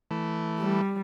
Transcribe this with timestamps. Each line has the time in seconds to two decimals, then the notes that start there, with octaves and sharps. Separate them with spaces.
0.11 E3 A3
0.60 G3